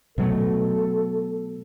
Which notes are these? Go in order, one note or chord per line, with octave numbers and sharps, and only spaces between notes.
B2 F#3 A3 A4